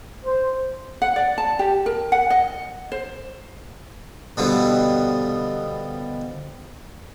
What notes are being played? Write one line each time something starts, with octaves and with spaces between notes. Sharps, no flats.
C5
F#5
D5
A5
G4
A#4
F#5
D#5
C5
B2 D3 F3 G3 B3